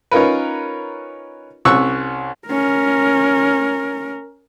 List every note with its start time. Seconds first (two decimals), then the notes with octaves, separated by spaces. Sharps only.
0.11 C#4 D#4 F4 A#4 B4
1.65 C2 C#4 C#6 E6 F#6
2.47 C#4 A#4